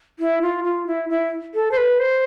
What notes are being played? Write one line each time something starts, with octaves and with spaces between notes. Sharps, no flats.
E4
F4
F4
E4
E4
A4
C5
B4
C5